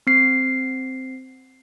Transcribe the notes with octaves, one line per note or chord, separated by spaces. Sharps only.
C4 C7